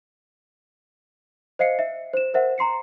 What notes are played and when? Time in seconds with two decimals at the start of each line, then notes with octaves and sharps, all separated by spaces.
1.59 C5 D#5 F5 C7 C#7
1.79 E5
2.13 C5 E7
2.34 A#4 C5 E5 F#5
2.58 A#5 C6 C7 C#7